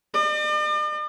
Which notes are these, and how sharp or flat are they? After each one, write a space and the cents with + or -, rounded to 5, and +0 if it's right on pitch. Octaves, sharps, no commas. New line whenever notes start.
D5 +45